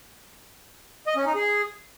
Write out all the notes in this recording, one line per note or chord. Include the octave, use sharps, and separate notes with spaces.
D#5
C#4
D#4
G#4